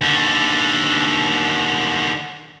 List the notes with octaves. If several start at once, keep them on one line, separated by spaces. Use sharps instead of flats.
D#2 D3